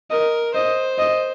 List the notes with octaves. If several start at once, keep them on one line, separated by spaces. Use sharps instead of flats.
A#4 D#5
C5 D#5
D#5